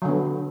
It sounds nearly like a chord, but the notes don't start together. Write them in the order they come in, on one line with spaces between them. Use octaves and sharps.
F#3 D3 B3